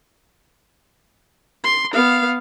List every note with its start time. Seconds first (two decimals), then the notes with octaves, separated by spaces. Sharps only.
1.64 C6
1.94 B3 F5